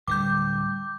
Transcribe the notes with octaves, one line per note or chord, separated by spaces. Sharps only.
D1 D3 G3 D6 G6